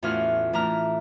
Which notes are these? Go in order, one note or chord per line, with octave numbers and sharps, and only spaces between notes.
E2 A2 C#4 F4 F#4 F6
A2 E3 D4 A#5 F6